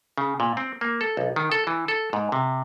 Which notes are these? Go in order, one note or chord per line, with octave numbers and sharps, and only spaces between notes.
C#3
A#2
C4
A#3
A4
B1
D#3
A4
E3
A4
G#2
C3